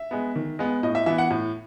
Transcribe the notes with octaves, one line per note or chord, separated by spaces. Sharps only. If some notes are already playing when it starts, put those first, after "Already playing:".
Already playing: E5
G#3 B3
D#3
G#3 B3
A2 D#5
E5
E3 B3 E5
F#5
A2